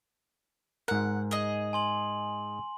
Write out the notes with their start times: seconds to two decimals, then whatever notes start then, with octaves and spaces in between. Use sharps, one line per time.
0.88 G#2 A#4 F#5
1.31 G#4 D#5
1.73 G#5 C6 F#7